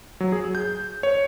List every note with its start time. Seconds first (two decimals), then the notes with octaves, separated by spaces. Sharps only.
0.20 F#3
0.32 G#4
0.55 G6
1.03 C#5